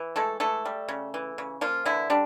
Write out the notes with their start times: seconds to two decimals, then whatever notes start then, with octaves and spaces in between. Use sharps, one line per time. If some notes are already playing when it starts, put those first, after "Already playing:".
Already playing: E3
0.16 G#3 A3 A4
0.40 E3 A3 A4
0.65 G3
0.89 C#3
1.14 E3
1.38 C#3
1.61 F3 A#3 F4
1.86 D3 E3 E4
2.10 G3 D4